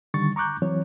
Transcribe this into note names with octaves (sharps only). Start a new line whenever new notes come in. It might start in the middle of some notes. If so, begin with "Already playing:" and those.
D3 D#3 G3 C#6 A6
A#5 C#6 D6 F#6 G6
E3 F#3 C4 C#5